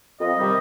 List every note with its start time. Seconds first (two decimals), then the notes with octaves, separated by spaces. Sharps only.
0.20 F2 D#5
0.37 C3 D#3 G3